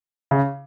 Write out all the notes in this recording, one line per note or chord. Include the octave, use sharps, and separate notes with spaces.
C#3